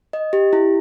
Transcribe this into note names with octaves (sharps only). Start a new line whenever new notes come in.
D#5
G4
E4